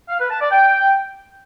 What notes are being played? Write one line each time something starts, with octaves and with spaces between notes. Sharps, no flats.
F5
B4
A5
D5
G5